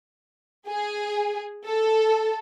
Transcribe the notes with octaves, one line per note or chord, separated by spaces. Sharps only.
G#4
A4